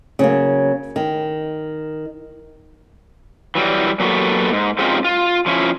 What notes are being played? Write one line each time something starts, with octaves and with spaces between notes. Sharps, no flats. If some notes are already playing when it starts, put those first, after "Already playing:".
C#3 F#3 A#3
D#3
E3 F#3 G3
F#3 A#3 B3 F#4 G4 A4
G#2
G#3 C4 C#4 D#4 F4 G4
F4
F3 C#4 E4